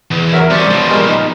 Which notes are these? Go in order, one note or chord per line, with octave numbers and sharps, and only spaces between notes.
E2
F#3 A#4 E5
C2 C#4 C5 D5
B2 F3
G3 G#3 A#4
D#4